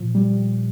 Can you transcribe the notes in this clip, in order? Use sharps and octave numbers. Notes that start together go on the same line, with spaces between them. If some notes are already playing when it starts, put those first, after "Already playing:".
Already playing: A#2 F3
G3